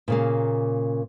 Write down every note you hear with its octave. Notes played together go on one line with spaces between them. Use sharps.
A#2 C#3 A#3